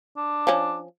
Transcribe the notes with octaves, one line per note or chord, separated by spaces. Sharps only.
D4
F3 C#4